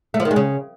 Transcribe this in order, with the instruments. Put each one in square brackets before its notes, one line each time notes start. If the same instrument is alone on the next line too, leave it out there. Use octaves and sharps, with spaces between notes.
[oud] A3
F3
D#3
G#3
C#3